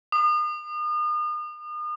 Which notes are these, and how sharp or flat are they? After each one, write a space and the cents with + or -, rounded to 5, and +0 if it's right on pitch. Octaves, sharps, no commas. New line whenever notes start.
D#6 -40